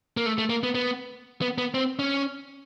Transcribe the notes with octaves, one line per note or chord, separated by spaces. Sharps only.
A#3
A3
A3
A#3
B3
B3
B3
B3
C4
C#4